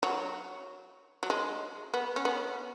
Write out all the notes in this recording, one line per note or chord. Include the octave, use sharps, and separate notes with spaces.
F#3
F#3
G#3
B3
C#4
B3